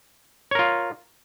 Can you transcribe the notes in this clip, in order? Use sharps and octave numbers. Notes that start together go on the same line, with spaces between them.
F4 A#4 C#5